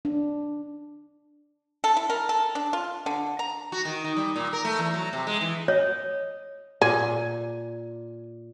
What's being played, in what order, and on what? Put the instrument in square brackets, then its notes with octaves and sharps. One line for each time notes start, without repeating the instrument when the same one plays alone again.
[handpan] D4
[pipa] A4
E4
A#4
A4
D4
F4
D3
A#5
[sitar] F#4
D#3
D#3
G3
A#2
A#4
A3
E2
F#3
C3
G#3
E3
[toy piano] C#5 [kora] D#5
[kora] A#2 [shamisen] G#4